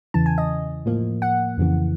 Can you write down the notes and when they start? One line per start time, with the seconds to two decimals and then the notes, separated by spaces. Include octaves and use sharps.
0.14 E2 C#3 E3 A5
0.26 G#5
0.38 D#5
0.86 A2 F3 A#3
1.22 F#5
1.58 F2 C#3 E3